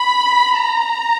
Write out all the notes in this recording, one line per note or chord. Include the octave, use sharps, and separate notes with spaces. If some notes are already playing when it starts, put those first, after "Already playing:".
Already playing: B5
A#5